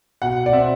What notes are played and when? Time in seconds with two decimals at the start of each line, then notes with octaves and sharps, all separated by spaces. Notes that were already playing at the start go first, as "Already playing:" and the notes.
0.22 B2 F#5
0.46 D5
0.53 C4 E5